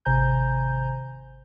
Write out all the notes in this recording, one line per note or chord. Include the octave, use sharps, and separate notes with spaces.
G#1 C3 C5 G#5 A#5 G6